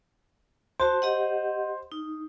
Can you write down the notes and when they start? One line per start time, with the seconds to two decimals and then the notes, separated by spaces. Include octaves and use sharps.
0.80 F#4 C5 A5
1.02 G4 D#5 F#5
1.92 D#4